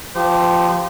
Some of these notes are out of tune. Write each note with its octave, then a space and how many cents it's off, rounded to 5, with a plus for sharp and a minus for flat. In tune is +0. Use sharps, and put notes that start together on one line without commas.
F3 +0 G4 -5 C5 -35